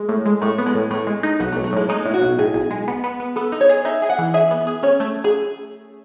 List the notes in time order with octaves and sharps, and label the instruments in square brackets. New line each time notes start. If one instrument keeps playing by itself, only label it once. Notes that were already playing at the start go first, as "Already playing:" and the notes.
Already playing: [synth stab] G#3
A2
G#3
[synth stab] A2 [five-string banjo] A3
[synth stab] B3
[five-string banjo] G#3
[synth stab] A2
[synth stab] A2 [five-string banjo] A3
[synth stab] G#3
D#4
[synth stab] B1 [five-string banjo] B3
[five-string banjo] A3
[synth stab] B1
[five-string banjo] A3
[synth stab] A2 [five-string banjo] G#3
[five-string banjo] G#3 [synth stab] D#4
[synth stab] A2
[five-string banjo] F#4
[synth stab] B1
[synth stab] A2 [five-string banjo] G#4
[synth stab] B1
G#3
B3
B3
B3
[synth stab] B3 [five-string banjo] A4
[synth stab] D#4
[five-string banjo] C#5
[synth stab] G#4
[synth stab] D#4 [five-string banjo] E5
[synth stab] G#4
[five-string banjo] F#5
[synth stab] E3
[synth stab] G#4 [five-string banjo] E5
[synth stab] B3
G#4
[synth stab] C#4 [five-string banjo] C#5
[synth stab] A3
[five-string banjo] G#4